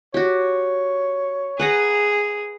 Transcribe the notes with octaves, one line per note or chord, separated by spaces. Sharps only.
F#4 G4 C#5
G#4 B4 F#5 A#5